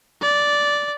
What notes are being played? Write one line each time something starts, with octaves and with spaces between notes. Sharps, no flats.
D5